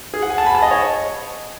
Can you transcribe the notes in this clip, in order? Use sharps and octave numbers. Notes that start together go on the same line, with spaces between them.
G#4
F#5
G#5
A5
B5
A5
D#5
C#5